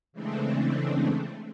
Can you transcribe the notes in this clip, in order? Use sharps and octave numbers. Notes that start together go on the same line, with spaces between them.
C#3 E3 G#3 A3 C4 D4